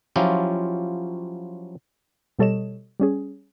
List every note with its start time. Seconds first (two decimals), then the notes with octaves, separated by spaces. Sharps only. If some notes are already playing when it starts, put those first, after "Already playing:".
0.16 F3 F#3 C#4 E4 F4 G4
2.39 B2 G3 A4 C#5 D#5 E7
3.00 G3 C#4 G#4